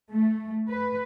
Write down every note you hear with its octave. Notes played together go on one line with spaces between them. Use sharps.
A3
B4